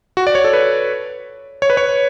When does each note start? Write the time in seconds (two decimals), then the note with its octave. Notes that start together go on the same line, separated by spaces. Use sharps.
0.17 F#4
0.27 D5
0.35 C#5
0.44 A4
0.53 B4
1.62 C#5
1.70 B4
1.77 C#5